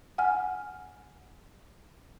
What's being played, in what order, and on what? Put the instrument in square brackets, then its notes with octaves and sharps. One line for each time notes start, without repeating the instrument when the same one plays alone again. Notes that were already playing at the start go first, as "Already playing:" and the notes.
[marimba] F#5 G#5 F6